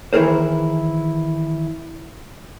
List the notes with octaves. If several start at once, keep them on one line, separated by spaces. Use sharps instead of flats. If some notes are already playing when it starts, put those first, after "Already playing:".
D#3 E3 E4 G#4 A#4 C5